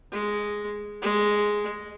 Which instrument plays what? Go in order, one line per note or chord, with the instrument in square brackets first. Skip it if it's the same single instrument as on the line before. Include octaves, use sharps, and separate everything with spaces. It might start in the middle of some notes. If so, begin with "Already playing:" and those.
[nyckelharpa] G#3
G#3